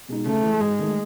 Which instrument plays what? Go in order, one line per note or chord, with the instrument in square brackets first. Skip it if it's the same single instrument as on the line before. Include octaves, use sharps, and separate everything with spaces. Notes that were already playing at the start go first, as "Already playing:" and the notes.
[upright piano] B2 G#3 D#4
[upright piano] C#3 [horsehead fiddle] A3
[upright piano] E3 G#3
[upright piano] G#2 [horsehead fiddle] G#3
[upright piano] D#3 A3